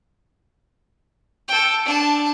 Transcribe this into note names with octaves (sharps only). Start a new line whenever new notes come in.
A4 G5
D4 A5